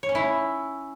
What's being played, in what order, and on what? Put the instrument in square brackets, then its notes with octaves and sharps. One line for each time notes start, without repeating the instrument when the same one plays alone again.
[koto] C#5
C#4
E4